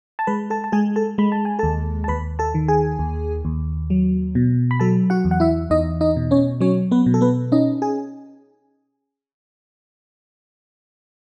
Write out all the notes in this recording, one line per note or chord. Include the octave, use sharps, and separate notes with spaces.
A5
G#3 B4 B5
A4 A5
A5
G#3 G#4 G#5
A4 A5
G#3 B5
A5
G#5
D#2 A4 A5
A5
D#2 B4 B5
A4 A5
D#3
G#4 G#5
D#2
D#2
F#3
B2
B5
F#3 A4 A5
F#4 F#5
E2
F#5
E4 E5
E2 D#4 D#5
D#4 D#5
B2
C#4 C#5
F#3 C#4 C#5
B3 B4
B2
A4
B3 B4
C#4 D#4 D#5
G#4 G#5